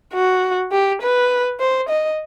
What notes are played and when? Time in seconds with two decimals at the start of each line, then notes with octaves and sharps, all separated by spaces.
0.14 F#4
0.72 G4
1.02 B4
1.60 C5
1.89 D#5